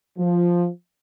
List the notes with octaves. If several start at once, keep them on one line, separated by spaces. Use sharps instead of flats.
F3